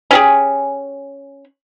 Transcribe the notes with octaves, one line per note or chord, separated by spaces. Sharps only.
C#4 G4 G#4